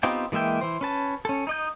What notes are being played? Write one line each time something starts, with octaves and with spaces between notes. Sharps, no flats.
B3 C4 D#4 F4 G4
E3 G#3 A#3 E5 G5
E3 C5
C#4 B4 A5
C#4 A4
D#4 D#5 G6